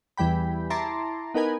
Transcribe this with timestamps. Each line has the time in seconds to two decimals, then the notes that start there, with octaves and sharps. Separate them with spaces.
0.17 E2 E3 G3 G5 B5
0.70 E4 A5 A#5 C6 D6
1.34 B3 D#4 A#4 B4 G#5